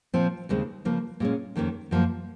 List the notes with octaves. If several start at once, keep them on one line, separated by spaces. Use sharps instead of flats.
A#2 F3 C4
D#2 C#3 G#3 C4
C#3 F3 A#3
A#2 G#3 C#4
F2 D#3 A#3 C#4
F#2 F3 A#3